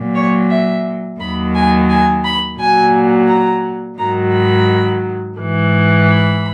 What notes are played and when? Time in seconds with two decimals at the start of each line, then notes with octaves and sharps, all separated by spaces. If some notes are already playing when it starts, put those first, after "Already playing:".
Already playing: A#2 F#3
0.15 C#5
0.50 E5
1.20 D#2 D#3 F#3 B5
1.55 G#5
1.89 G#5
2.24 B5
2.59 A#2 F#3 G#5
3.29 A#5
3.98 G#2 D#3 F#3 A#5
4.33 B5
5.37 G#2 E3
6.07 B5